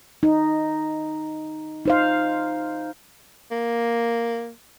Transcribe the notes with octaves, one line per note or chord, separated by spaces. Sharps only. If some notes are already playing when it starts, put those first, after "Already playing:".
D#4
D#4 C5 F5
A#3